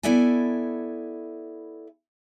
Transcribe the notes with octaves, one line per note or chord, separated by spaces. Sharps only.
B3 E4 A4 D5 E5 G#5